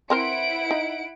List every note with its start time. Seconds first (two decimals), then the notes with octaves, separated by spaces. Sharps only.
0.10 C4 E4 A#4 C5 F#5 D7
0.71 D#4